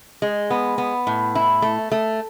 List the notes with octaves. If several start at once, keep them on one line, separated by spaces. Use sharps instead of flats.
G#3
B3
B3
A2
E4
A3
A3